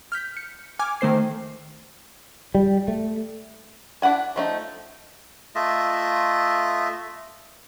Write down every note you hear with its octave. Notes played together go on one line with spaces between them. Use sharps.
F6 G6 B6
C#7
G#5 D6 F6 G#6
D#3 A3 C5 C7
G3
A3
D4 E4 F#5 G#5
F3 A3 D#4
A3 F4 D#5 E5